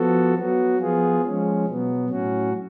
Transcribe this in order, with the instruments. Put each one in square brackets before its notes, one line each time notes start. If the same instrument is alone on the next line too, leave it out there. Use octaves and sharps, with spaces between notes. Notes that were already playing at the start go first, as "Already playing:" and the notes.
Already playing: [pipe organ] F3 B3 F#4 A4
F#3 B3 F#4
F3 B3 F4 G#4
F3 G#3 C#4
B2 F#3 B3
A2 F#3 C#4 F#4